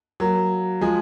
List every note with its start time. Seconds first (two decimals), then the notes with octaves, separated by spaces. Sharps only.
0.20 F#3 A#3
0.81 F3 G#3